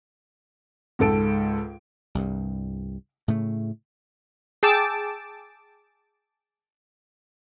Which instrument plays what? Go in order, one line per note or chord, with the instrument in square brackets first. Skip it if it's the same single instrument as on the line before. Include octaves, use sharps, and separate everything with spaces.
[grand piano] C#2 G#2 A4 D7
[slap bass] C2 G2
A2 C#3 A3
[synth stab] G#4 G5 A5 D6 E6